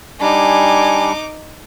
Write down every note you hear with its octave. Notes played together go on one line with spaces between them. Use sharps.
G3 D4 D#4 G#5 D6